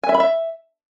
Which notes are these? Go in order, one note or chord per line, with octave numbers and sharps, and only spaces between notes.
G#5
E5
B5
E5